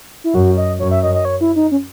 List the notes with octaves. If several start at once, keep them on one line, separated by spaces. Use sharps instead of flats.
E4
F#2 F#4
D#5
F#2 C#5
E5
D#5
D#5
C#5
E4
D#4
C#4